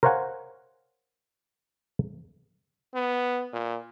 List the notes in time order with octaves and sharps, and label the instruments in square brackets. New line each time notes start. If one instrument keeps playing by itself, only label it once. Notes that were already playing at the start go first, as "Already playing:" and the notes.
[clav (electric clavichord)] A#4 C5 C#5 F5 F#5 G#5
[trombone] B3
A#2